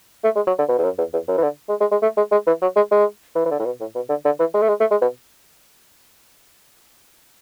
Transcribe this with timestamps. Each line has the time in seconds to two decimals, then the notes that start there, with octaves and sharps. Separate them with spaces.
0.24 A3
0.36 G#3
0.47 F#3
0.58 D3
0.69 B2
0.78 E2
0.84 F#2
0.98 E2
1.13 E2
1.28 F#2
1.38 E3
1.43 D3
1.69 G#3
1.81 G#3
1.91 G#3
2.02 A3
2.17 G#3
2.32 G#3
2.47 E3
2.62 F#3
2.76 G#3
2.91 G#3
3.35 E3
3.45 E3
3.51 D3
3.59 A2
3.66 B2
3.80 A2
3.95 B2
4.09 D3
4.25 D3
4.39 E3
4.54 G#3
4.62 A3
4.69 G#3
4.80 A3
4.91 G#3
5.02 B2